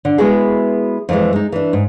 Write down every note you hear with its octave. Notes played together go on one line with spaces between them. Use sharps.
D3
G#3 B3 E4 F#4 G#4
F2 E3 G#3
G#3 D#4
E3 D4
G#2